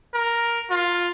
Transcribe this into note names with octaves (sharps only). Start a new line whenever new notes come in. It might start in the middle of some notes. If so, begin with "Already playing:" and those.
A#4
F4